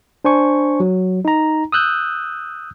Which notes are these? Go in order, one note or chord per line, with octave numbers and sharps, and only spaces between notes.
D4 C5 G#5 C#6
F#3
D#4 A#5
D#6 E6 F#6 G6